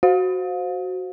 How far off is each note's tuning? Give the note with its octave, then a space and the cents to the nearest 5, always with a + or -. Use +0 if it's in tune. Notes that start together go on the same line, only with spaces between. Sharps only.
F#4 +0 C5 +0 F5 +30